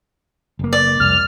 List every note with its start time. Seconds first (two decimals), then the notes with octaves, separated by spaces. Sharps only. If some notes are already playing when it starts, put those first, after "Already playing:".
0.59 F#1 A#3
0.73 D5
1.00 C2 F2 F6